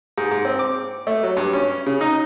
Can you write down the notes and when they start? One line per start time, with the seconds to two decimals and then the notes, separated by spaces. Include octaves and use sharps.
0.18 G#2
0.31 G#2
0.45 C4
0.59 D6
1.07 A3
1.23 F#3
1.37 G2
1.53 C#4
1.86 C#3
2.01 D#4